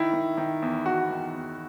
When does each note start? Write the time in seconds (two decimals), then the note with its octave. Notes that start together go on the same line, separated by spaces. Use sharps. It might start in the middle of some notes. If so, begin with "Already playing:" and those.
Already playing: D#3 E4
0.13 D#3
0.38 D#3
0.62 E2
0.86 E2 F#4
1.10 D#3
1.35 E2